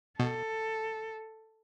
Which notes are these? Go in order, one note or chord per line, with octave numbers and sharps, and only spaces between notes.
B2 A4